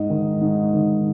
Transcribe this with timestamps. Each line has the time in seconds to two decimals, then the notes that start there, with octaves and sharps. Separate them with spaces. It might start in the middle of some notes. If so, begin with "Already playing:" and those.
Already playing: G#2 D#5
0.10 D#3
0.41 G#2
0.73 D#3